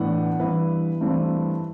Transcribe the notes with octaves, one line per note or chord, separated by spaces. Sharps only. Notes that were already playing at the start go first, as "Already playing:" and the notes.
Already playing: A2 E3 B3 D4 F#5
G2 E3 B3 E4 B4
G2 E3 A3 C4 E4